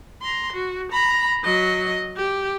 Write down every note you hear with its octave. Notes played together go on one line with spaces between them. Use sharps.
A#5 C6
F#4
A#5 B5
F#3 D#5
G4